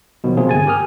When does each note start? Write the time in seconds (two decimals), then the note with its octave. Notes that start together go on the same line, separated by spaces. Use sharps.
0.24 B2 D#3 F3 F#3
0.37 C3 F3 A#3 C4 G#4
0.49 G1 G#5 A6
0.67 G4 A#4 G#5 D#6 F6